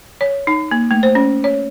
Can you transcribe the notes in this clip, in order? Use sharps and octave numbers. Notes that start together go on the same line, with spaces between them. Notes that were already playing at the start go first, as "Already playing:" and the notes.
C#5
D#4
A#3
A3
C5
C#4
C#5